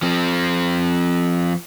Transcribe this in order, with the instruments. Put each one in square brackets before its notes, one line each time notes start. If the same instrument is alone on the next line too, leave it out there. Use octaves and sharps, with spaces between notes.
[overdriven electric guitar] F3 C4